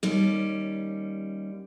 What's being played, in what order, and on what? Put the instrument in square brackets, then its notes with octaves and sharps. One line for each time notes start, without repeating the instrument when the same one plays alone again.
[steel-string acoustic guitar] D#2 G3 C#4